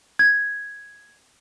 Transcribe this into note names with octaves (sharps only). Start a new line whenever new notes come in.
G#6